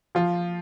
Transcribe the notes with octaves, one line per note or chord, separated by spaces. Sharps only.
F3 F4